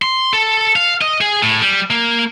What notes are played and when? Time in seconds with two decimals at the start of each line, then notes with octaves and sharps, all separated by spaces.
0.02 C6
0.33 A4
0.76 F5
1.01 D#5
1.21 G#4
1.42 A2
1.61 G3
1.90 A#3